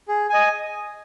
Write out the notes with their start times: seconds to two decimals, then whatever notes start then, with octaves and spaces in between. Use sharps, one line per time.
0.08 G#4
0.30 D#5 G#5